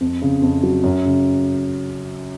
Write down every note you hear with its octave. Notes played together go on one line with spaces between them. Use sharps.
F2
C#3
F2
F#3
F#2
C#3